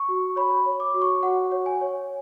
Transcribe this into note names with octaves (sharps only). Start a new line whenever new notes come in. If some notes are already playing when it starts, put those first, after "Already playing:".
Already playing: C#6
F#4
C#5 B5
C#5
D6
F#4
C#6
F#4 F#5
C#5
G#5
C#5